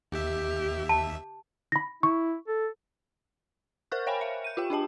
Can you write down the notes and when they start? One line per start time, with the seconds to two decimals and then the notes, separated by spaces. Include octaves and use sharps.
0.12 D#2 G4 E5
0.89 A5
1.72 B5 A#6
2.03 E4 C#6
2.48 A4
3.92 A#4 C5 C#6 F6 F#6
4.07 C#5 F5 G5 G#5 B5
4.21 E5
4.44 G6 D#7
4.57 F4 G4 G5
4.70 D4 G4 D#5 A5